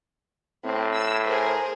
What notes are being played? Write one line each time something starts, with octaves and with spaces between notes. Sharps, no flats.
A2 C4
E6
G#4 A#4 C5